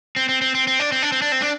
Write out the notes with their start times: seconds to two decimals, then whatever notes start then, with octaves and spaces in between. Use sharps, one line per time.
0.16 C4
0.29 C4
0.42 C4
0.55 C4
0.67 C4
0.80 D4
0.92 C4
1.02 D4
1.12 C4
1.22 D4
1.32 C4
1.42 D4